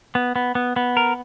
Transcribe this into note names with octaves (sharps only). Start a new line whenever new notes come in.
B3
B3
B3
B3
A#4